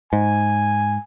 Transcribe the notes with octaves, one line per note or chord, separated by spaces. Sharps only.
G#2 G#5